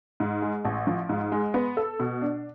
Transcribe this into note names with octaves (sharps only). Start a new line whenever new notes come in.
G#2
G#3
A1
F3
G#2
G#3
B3
A4
B2
D4